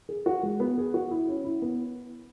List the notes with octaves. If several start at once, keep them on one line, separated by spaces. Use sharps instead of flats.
G#4
F#4
G#3
B3
G#4
F#4
E4
C#4
E4
B3